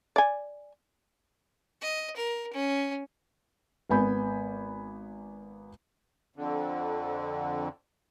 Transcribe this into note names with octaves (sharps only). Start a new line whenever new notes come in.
D5 G#5
D#5
A#4
C#4
G#1 B3 G#5 B5 G6
F2 D3